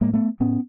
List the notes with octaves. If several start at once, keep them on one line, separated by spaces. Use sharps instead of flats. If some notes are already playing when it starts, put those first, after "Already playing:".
A2 G#3 A#3
A3 B3
A2 B3 C#4